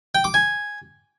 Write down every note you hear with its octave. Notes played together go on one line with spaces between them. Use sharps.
G5
D6
G#5